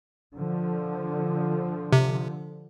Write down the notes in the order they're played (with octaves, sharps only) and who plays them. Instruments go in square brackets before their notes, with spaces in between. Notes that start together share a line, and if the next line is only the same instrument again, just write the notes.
[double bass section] D3 F3
[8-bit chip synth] C3